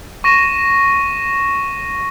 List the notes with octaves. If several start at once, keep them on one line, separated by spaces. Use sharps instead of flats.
C#6 A#6 D#7 E7